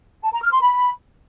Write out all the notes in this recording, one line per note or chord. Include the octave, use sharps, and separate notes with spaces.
A5
A#5
F6
C6
B5